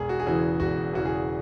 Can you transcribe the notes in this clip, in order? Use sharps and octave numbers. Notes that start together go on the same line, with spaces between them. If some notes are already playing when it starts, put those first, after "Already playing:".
Already playing: E1 G#4
F#4
G#4
E2 C#3 E3 F#4
E1 F#4
E2 C#3 E3 F#4
G#4